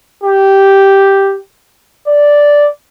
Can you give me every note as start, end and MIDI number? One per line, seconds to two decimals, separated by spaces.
0.24 1.37 67
2.08 2.68 74